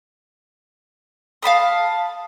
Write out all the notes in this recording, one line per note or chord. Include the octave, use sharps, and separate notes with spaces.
F5 A5 B5 D#6